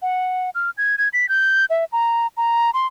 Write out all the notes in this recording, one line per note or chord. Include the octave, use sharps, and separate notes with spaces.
F#5
F6
G#6
G#6
B6
G6
E5
A#5
A#5
C6